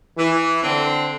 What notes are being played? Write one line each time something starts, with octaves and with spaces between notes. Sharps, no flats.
E3
D3 C4